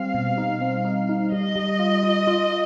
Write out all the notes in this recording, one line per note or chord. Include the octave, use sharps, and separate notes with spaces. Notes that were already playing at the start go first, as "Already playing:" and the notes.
Already playing: G3 C4 F5
B2
D#4
C4
D#4
D#4
G3 D#5
G3
F4
F4
F4